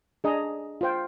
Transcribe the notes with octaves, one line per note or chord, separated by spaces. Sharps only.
D4 G#4 D#5 A#5
F4 C5 G5